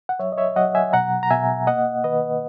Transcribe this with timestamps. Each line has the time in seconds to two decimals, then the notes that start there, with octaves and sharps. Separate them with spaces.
0.09 F#5
0.19 F#3 C#5 E5
0.32 D#5
0.38 C#5 E5
0.56 F#3 D#5 F#5
0.75 E5 G#5
0.93 B2 F#5 A#5
1.23 A#5
1.30 B2 E5 G#5
1.67 A#3 D#5 F#5
2.04 D#3 B4 D#5